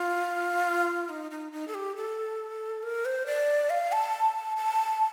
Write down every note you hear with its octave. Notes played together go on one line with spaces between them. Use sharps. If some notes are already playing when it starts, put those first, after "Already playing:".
Already playing: F4
D#4
D#4
D#4
A4
G4
A4
A#4
C5
D5
F5
A5
A5